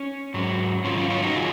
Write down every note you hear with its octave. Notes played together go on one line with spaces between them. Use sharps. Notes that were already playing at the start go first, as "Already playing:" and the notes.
Already playing: C#4
G#2 F#3
G#2 D#3 F#3 C#4 F4
C#4 F4
C#4 F4
D#4 F#4
D#3 F#3 F4 G#4